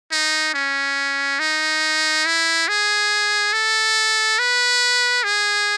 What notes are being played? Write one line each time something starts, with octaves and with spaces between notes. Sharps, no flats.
D#4
C#4
D#4
E4
G#4
A4
B4
G#4